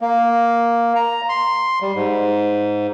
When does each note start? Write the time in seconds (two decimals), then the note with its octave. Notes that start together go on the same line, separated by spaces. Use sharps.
0.01 A#3
0.95 A#5
1.29 C6
1.82 G3
1.95 G#2